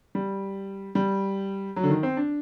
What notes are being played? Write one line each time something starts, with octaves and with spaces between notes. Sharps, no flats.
G3
G3
F#3
D3
D#3
C4
D4